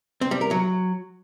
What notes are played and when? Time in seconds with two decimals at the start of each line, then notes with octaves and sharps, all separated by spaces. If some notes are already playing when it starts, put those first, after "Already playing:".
0.21 C4
0.31 G3
0.41 A#4
0.51 F#3